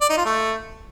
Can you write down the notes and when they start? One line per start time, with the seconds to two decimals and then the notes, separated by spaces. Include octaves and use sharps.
0.01 D5
0.09 D#4
0.18 F4
0.26 A3